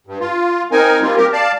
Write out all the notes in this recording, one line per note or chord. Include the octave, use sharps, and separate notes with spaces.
G2
F4
C4 D#4 A#4 G#5
G3 A#3 C4 F4
G4 A#4
D5 F5 A5